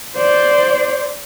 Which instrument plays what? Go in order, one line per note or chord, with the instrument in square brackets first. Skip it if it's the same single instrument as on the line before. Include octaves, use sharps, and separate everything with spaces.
[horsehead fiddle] C5 D5